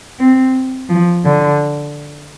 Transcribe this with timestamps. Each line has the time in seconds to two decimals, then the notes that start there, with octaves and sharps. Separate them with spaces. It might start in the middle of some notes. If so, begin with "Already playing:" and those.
0.20 C4
0.89 F3
1.25 D3